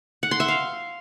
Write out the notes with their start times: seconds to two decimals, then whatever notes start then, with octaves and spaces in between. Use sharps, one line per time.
0.23 F#5
0.31 C6
0.40 E5
0.48 F5